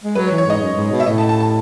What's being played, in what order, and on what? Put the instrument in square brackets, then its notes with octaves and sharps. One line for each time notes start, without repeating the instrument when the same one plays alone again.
[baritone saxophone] G#3
[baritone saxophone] F#3 [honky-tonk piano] B4
[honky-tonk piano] C#5
[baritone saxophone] E3
[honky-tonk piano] C#5
[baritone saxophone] G#2 [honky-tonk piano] D#5
[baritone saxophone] F#2
G#2
B2
[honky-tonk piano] E5
[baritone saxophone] A2 [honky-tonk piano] D#5
[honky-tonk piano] A5
A5
A5